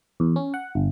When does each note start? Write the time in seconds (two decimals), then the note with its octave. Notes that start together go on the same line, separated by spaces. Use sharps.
0.20 E2
0.36 C#4
0.54 F#5
0.75 G1